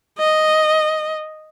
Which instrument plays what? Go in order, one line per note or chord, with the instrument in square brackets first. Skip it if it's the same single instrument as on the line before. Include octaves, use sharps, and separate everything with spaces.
[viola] D#5